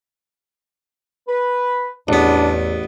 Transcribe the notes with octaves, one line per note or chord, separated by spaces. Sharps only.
B4
A1 E2 B3 D4